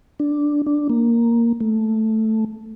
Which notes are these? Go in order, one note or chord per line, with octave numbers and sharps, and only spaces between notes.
D4
D4
A#3
A3